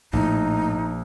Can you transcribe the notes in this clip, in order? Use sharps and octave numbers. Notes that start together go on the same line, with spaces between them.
A#1 A2 D#4